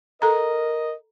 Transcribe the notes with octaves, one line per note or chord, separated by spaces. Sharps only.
A4 A#4 D#5 A#5